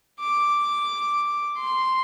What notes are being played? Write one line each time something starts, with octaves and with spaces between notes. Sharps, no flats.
D6
C6